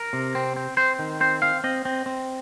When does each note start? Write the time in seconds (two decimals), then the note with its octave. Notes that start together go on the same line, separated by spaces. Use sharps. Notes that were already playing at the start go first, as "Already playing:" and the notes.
Already playing: A#4
0.13 C3
0.35 C4
0.57 C4
0.77 C4 C5
0.99 D#3
1.21 C4 C5
1.42 C4 F5
1.64 C4 D#5
1.85 C4
2.06 C4